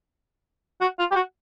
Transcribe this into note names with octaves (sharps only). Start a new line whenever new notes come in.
F#4
F4
G4
F#4